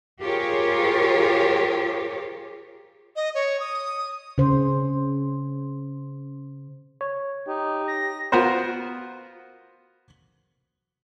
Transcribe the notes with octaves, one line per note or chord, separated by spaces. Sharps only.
F4 G4 G#4 A#4 C5 C#5
D#5
C#5
D#6
C#3 C5
C#5
D#4 G4
A#6
B3 F4 F#4 A#4 C5